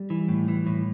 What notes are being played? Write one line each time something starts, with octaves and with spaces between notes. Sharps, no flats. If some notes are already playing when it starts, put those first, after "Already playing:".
Already playing: G3
E3
A2
E3
A2